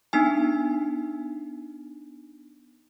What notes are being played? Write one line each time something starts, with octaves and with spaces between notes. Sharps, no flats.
B3 D4 D#4 G#5